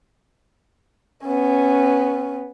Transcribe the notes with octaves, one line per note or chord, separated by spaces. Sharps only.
B3 C#4